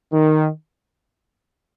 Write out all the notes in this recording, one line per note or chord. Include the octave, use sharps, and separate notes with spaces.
D#3